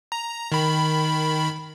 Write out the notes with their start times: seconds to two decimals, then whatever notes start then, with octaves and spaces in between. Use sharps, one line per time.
0.12 A#5
0.52 D#3 B5